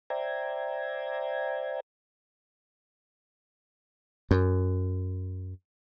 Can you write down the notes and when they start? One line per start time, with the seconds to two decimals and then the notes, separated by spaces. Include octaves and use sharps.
0.10 C5 D5 E5 G5 A#5 G#6
4.31 F#2